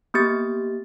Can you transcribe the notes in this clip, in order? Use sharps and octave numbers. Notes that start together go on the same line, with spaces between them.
A#3 B3 G4 A6